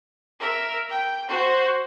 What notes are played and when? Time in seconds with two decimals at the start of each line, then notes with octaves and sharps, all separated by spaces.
0.40 A#4 E5
0.89 G5
1.28 F#4 C5